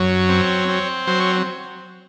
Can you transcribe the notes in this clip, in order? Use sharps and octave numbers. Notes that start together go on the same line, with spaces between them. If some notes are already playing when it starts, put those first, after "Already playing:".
Already playing: F#2 F#3 C#5
C4
C4
F#3 C5
C#5